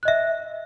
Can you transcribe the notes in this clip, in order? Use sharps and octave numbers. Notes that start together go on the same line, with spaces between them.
D#5 E5 F#6